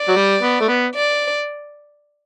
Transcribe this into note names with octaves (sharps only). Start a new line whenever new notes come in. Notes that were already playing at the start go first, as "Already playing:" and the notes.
Already playing: D5
F#3
G3
B3
A3
B3
D5